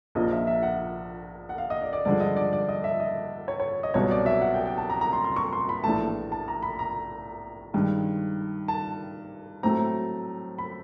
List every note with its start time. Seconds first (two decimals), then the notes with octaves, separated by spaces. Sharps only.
0.15 A#1 A#2 F3 A#3 D#5
0.32 E5
0.47 E5
0.63 F#5
1.49 F#5
1.58 F5
1.70 D#5
1.82 D5
1.93 D5
2.05 G2 D3 F3 G#3 D5
2.20 D#5
2.36 D5
2.53 D5
2.69 D#5
2.84 E5
3.00 D#5
3.48 C#5
3.60 C#5
3.83 D#5
3.94 C2 B2 F#3 C#5
4.11 D5
4.26 E5
4.41 F#5
4.54 G5
4.66 G5
4.78 A5
4.90 A#5
5.01 A#5
5.13 C6
5.24 C6
5.36 C#6
5.53 C6
5.69 B5
5.84 A#1 A2 E3 A3 A5
6.32 A5
6.48 A#5
6.63 B5
6.79 A#5
7.74 G2 D#3 G#3
8.68 A5
9.63 A2 F#3 A3 C4 A#5
10.58 B5